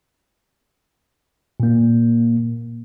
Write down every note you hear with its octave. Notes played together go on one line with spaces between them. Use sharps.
A#2 A#3